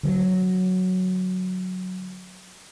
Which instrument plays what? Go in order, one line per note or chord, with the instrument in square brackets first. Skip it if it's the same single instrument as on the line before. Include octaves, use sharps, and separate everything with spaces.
[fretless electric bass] D3 F#3